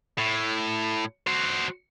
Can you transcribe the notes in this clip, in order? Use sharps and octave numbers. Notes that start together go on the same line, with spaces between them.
A2
F#4 C5